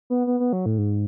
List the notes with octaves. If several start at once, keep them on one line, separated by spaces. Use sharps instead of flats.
B3
B3
B3
F#3
A2
G#2